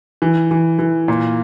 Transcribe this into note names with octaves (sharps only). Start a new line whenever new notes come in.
E3
E3
E3
A#2